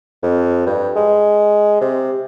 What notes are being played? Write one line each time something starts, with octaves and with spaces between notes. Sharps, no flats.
F2
G2
G#3
C3